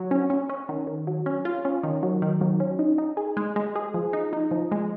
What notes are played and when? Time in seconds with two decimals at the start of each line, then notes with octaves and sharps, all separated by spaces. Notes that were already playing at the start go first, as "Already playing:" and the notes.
Already playing: F#3
0.11 C#4
0.30 C#4
0.49 C#4
0.69 D#3
0.87 D#3
1.07 F#3
1.26 C#4
1.45 F4
1.65 C#4
1.83 D#3
2.03 F#3
2.22 D#3
2.41 F#3
2.60 C#4
2.79 D#4
2.98 D#4
3.17 G#4
3.37 G#3
3.56 G#3
3.76 G#4
3.94 F3
4.13 D#4
4.33 D#4
4.51 F3
4.71 G#3